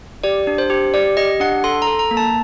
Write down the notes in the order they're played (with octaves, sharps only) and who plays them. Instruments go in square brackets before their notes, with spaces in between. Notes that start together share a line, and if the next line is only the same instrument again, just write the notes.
[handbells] G4 D5
D4
C5
G4
G4 D5
G4 D#5
D4 F#5
A4 C6
A#5
A4
A#5
A#3
A5